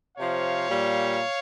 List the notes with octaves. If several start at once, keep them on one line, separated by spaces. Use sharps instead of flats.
C3 F3 C#5 F5
A#2 G3